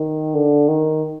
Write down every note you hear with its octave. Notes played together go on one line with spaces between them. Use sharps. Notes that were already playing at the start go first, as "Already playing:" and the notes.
Already playing: D#3
D3
D#3